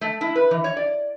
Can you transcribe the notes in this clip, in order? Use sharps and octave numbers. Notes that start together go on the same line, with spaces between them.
A3
E4
B4
E3
C#5
D5